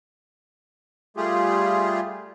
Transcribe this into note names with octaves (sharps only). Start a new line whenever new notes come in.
G3 A3 F4 G4 G#4